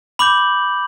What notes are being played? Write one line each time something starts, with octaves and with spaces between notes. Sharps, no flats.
B5 D6 G6 F#7